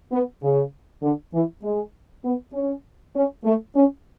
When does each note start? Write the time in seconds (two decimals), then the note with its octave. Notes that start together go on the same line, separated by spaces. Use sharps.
0.12 B3
0.43 C#3
1.03 D3
1.34 E3
1.63 G#3
2.25 B3
2.54 C#4
3.15 C#4
3.44 A3
3.76 C#4